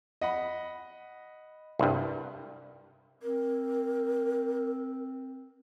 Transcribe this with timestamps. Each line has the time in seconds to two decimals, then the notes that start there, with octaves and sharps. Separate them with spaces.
0.21 D#5 F#5 B5
1.79 C2 G2
3.22 C4 A#4